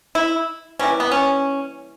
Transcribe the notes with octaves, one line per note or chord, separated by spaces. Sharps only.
E4
E3 G3 A#3 C#4
B3
C#4